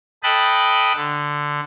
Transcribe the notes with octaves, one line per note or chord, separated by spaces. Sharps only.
A4 D#5 G5 A5 B5 F#6
D3